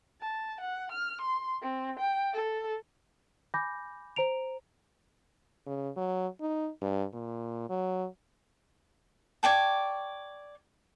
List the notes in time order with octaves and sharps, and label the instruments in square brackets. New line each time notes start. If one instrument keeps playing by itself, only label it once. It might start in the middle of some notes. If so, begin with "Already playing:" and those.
[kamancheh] A5
F#5
F6
C6
C4
G5
A4
[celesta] G#5 B5 D6 G6 A#6
C5 A#5 D7 F7
[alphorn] C#3
F#3
D#4
G2
A#2
F#3
[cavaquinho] C#5 D5 G5 A5